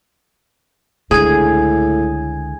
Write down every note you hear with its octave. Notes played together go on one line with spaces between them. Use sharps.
C#2 A2 D3 G#4 G#5 G#6